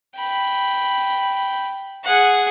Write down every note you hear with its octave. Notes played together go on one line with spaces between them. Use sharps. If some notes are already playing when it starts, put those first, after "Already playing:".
G5 B5
G#4 F#5